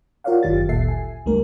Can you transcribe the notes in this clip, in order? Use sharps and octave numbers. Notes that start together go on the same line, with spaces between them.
F4 A#4 C#5 D5 F5 F#5
G1 F#2 D#3 F4 G4 A6
G1 D2 A#2 A4 E5 C7
G#5
C#2 G3 A3 D4 A#4